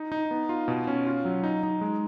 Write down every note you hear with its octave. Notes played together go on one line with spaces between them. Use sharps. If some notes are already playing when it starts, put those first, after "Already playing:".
Already playing: D#4
D#4
B3
F4
B2
C#4
F4
F#3
D#4
D#4
G#3